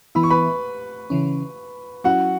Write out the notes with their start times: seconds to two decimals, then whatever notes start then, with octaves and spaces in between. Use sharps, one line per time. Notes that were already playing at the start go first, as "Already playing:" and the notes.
0.15 E3 B3 E4 B5
0.23 C#6
0.30 B4 B5
1.10 C#3 E3 C#4
2.04 F#3 C#4 E4 F#4 F#5